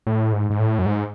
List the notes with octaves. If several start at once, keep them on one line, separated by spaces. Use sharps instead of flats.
A2
G#2
G#2
A2
F#2
G#2